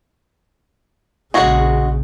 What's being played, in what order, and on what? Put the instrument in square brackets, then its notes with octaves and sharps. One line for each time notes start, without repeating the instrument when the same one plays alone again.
[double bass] A#1 C#3 [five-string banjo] G#3 F#4